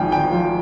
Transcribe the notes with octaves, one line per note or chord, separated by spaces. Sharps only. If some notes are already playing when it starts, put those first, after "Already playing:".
Already playing: G#1 G#2 F3 G5
G#1 G5
F3